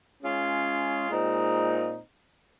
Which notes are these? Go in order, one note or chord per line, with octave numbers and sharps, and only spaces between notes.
G#3 C#4 F4 G#4 C#5
A#2 G#3 C4 D#4